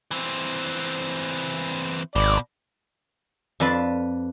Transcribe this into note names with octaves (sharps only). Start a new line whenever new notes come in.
E3 C4
G#1 B2 D5
F2 D4 B4 F5 A5